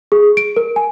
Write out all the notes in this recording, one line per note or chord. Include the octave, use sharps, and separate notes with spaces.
G#4
D7
A#4
G#5